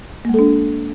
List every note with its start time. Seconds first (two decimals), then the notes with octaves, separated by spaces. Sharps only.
0.25 A#3
0.29 G#3
0.34 A4
0.39 D4